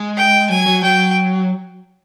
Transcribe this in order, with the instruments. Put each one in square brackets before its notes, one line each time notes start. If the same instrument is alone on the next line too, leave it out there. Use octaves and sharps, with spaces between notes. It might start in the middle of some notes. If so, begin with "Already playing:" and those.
Already playing: [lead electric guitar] G#3
[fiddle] G5
[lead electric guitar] F#3 [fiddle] G#5
[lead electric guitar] F#3
[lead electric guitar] F#3 [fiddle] G5